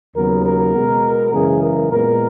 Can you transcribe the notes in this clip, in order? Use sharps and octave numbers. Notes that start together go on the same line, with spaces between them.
D#2 C#3 F#3 B3 A#4
A#4
B2 G#3 B3
F#2 C#3 E3 G#3 G#4
A#4
A#2 G#3 B3 A#4